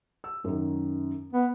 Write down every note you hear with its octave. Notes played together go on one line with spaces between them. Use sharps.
E6
F#2 D#3
B3